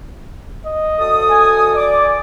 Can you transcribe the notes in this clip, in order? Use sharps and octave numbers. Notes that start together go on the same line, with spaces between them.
D#5
D2 A4 D#6
G#5
D5 D6